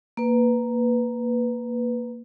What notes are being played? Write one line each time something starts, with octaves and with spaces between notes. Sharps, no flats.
A#3 B4